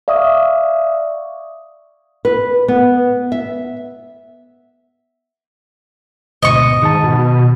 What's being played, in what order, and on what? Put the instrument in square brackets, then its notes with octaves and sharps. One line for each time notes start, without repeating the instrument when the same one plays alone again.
[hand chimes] D5 E5 F5 C#6 D#6
[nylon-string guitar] B4
B3
E5
[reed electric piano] D2 G#2 B2 [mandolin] D#5 C#6
[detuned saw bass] G#2 [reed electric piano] D#3 A5
[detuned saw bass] B2